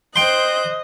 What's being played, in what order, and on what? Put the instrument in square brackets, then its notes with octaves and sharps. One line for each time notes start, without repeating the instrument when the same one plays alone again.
[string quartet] C5 F#6 G6 [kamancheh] D#5 [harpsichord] G5 C6